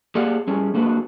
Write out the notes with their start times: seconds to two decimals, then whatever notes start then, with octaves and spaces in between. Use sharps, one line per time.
0.15 A#3 G4 G#4 D5 F5 F#5
0.47 G3 C#4 G#4
0.74 G#3 A#3 D4 F#4 B4